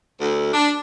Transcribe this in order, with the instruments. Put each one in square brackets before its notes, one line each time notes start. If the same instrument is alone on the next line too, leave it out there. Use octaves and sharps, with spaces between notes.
[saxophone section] D2
D4